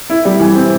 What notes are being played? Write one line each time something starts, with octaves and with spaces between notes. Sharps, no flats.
E4
G3
E3
C4